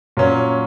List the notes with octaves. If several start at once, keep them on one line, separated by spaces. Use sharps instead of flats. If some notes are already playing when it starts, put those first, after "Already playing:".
A#2 F#3 C#4